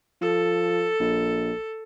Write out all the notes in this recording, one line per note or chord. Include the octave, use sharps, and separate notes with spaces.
F3 A4
A#1